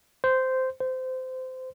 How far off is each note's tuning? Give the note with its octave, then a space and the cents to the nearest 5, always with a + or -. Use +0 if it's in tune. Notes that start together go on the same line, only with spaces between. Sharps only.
C5 -10
C5 -20